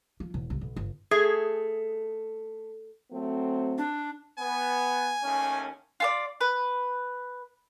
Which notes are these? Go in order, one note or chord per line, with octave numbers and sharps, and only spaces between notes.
F3
E1
C2
B1
G1
A3 G#4
F#3 A3 C4
D4
B3 G#5
D#2 A3 C#4
F4 A4 D5
B4